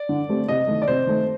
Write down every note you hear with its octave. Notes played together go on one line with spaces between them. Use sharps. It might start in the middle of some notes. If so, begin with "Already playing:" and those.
Already playing: D5
D3
A3 C4 G4
C3 D#5
D#3 A3
D5
C3 C5
D#3 A3